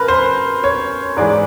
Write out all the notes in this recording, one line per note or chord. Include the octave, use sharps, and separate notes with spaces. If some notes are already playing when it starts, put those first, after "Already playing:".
Already playing: F#2 C#3 A#4 B4
C5
C#5
G#2 E3 G#3 D5